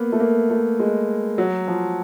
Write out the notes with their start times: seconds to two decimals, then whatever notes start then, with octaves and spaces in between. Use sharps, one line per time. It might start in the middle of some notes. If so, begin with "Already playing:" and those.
Already playing: A#3 B3
0.12 A3
0.20 A#3
0.50 A3
0.79 G#3
1.38 F#3
1.68 F3